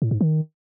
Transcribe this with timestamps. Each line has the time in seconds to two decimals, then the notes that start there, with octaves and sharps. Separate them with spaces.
0.02 A2
0.11 G#2
0.21 D#3